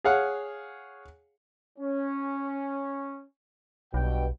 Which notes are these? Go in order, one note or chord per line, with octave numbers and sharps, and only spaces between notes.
G#4 C#5 F5 F#5
C#4
B1 G2 B2 G5